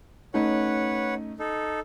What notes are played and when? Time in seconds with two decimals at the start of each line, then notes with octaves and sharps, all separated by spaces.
0.34 A3 C#4 D#4 B4 C#5 F#5
1.39 D#4 A4